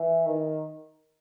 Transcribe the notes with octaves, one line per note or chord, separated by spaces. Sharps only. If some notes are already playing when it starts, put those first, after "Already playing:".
Already playing: E3
D#3